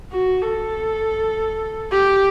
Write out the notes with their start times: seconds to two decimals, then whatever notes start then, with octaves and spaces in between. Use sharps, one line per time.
0.12 F#4
0.42 A4
1.92 G4